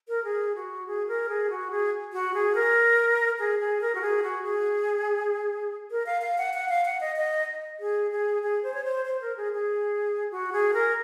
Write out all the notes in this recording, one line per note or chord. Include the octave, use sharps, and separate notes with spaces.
A#4
G#4
F#4
G#4
A#4
G#4
F#4
G#4
F#4
G#4
A#4
G#4
G#4
A#4
F#4
G#4
F#4
G#4
A#4
F5
F5
F#5
F#5
F5
F#5
D#5
D#5
G#4
G#4
G#4
C5
C#5
C5
C5
A#4
G#4
G#4
F#4
G#4
A#4